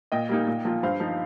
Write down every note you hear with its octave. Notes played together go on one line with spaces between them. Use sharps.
A#2 D#5 G5
G3 A#3 D#4
A#2
F3 A#3 F4
G2 C5 F5
F3 D#4